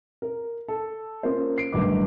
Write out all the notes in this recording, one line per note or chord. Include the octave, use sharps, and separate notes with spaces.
A#4
A4
A#3 C#4 F4 A#4 C5
C7 D7
D1 G1 A2 D#3 B4 D6